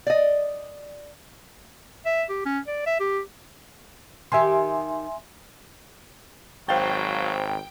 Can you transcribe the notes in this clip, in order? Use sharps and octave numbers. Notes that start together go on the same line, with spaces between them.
D5 D#5
E5
G4
C#4
D5
E5
G4
D#3 G4 E5 G#5 C6
G#1 F#3 C5 F5 G5 A6